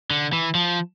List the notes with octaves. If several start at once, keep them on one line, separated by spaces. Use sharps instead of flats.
D3
E3
F3